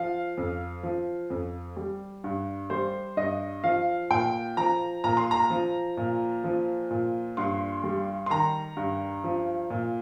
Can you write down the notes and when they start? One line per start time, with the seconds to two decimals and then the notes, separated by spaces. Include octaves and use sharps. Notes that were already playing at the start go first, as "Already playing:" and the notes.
Already playing: F3 F5
0.37 F2
0.83 F3
1.30 F2
1.76 G3
2.24 G2
2.70 G3 C5
3.17 G2 D#5
3.64 F3 F5
4.11 A#2 G5
4.57 F3 A#5
5.04 A#2 A#5
5.17 C6
5.31 A#5
5.50 F3
5.97 A#2
6.44 F3
6.91 A#2
7.37 G2 C6
7.84 G3
8.26 C6
8.30 D#3 A#5
8.77 G2
9.24 F3
9.70 A#2